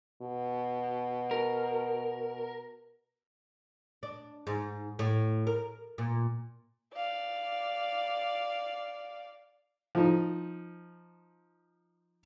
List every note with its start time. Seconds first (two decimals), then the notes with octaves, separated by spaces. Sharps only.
0.22 B2
1.31 A#4
4.03 D4
4.47 G#2
4.99 A2
5.47 A#4
5.98 A#2
6.94 D5 F5
9.95 F3 D#4